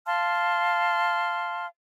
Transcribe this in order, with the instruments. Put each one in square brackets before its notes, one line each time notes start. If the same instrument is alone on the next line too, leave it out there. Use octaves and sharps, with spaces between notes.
[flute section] F5 A5 C6 F6